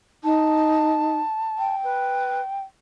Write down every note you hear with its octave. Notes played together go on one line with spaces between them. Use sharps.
D#4 A5
G5
B4